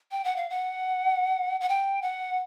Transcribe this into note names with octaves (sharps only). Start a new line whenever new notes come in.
G5
F#5
F5
F#5
F#5
G5
F#5